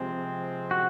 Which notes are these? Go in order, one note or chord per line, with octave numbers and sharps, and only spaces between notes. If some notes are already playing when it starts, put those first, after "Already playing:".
Already playing: C3 F3 G#3 C4
F#4